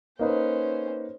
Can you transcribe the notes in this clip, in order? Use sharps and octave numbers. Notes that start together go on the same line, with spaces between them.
A#3 C#4 D#4 B4 C5